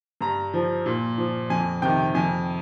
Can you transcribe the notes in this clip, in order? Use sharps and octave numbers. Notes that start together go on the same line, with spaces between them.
G2 A#5
F3
A#2
F3
F2 G#5
C3 D#3 G5
F2 G#5